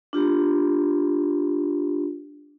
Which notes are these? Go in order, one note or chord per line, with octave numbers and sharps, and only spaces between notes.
D4 F4 G4